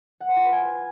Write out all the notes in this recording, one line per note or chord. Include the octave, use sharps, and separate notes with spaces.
F#5
C5
F4
B4
G#5